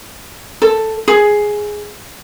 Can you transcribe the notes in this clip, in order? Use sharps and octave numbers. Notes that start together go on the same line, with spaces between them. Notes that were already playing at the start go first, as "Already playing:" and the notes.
A4
G#4